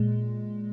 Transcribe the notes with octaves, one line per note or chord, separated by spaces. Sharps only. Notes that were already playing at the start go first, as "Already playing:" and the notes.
Already playing: A#2 G#3